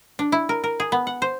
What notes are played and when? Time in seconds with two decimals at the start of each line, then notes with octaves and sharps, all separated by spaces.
0.19 D4
0.32 E4
0.49 A#4
0.64 A#4
0.80 G#4
0.92 B3
1.07 F#5
1.22 C5